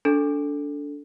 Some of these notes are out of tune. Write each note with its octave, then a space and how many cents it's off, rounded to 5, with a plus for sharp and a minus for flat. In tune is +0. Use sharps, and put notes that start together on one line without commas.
D4 -20 A4 +0